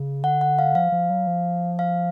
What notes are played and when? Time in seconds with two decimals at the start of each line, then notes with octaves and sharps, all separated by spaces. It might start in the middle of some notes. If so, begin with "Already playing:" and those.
Already playing: C#3
0.23 D3 F#5
0.41 F#5
0.59 F5
0.75 F3 F5
0.92 F3
1.10 F#3
1.27 F3
1.79 F5